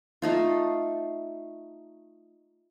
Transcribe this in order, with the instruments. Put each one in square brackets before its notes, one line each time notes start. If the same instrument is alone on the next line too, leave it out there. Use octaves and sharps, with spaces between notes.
[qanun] A3 D#4 F4